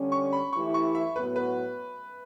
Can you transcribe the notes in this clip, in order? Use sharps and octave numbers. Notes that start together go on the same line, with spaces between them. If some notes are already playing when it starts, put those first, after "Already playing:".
Already playing: D3 G3 C#4
C#6
B5
E3 A3 E4 G4 C#6
C#6
E5
A2 F#3 B3 F#4 B4
B4